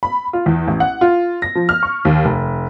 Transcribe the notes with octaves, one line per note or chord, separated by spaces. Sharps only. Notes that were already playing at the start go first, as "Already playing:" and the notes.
B5
F4
E2
A1
F#5
F4
A#6
F3
F6
C#6
D#2
F1